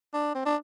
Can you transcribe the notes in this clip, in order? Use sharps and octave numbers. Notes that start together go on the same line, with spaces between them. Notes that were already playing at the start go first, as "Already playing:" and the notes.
D4
C4
D4